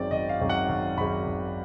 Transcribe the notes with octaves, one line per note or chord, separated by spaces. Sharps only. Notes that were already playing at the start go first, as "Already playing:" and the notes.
Already playing: G#1 F#2 D#3 G#3 C4 D5
G#1 D#5
F5
F#2 D#3 G#3 C4
F#5
G#1
F#2 D#3 G#3 C4 B5
G#1